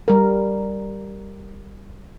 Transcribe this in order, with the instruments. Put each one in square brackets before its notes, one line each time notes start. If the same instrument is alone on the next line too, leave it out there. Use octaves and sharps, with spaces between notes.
[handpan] G3 A#4